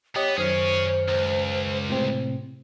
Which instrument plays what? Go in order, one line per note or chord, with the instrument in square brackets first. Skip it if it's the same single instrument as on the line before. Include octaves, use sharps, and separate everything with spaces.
[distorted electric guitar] B3 [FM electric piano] G4 D#5 [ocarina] C#5
[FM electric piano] F#2 D#3 F6 [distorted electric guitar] G#4 C#5 [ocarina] C5
[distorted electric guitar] C#2
[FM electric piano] A2 C3 C4